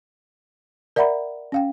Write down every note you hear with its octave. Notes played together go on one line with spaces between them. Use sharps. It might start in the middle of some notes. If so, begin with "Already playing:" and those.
A#4 D5 E5 F#5 A#5 B5
C#4 F5 G5